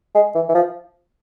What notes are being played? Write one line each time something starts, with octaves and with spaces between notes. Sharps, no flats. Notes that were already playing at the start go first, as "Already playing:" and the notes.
G#3
E3
E3
F3